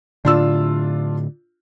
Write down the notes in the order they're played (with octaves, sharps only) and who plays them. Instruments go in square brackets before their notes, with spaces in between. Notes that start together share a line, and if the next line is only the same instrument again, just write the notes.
[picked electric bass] A2 D3 [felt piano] D4 F4 E6